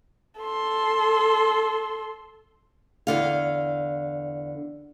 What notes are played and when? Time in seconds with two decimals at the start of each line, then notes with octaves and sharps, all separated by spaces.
0.41 A4 C6
3.07 E2 D3 F5